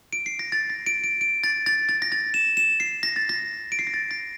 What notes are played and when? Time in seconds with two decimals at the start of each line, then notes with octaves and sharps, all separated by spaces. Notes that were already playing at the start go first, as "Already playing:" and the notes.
0.13 D7
0.26 C7
0.39 A#6
0.52 A6
0.70 A#6
0.86 D7
1.04 D7
1.21 D7
1.44 A6
1.66 A6
1.89 A6
2.02 A#6
2.12 A6
2.34 E7
2.57 E7
2.80 C7
3.03 A#6
3.16 A6
3.29 A#6
3.72 D7
3.79 C7
3.87 A#6
3.94 A6
4.11 A#6